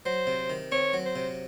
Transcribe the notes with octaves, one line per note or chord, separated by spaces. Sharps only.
F#3 C5
C3
D#3
C4 C#5
F#3
C5
C3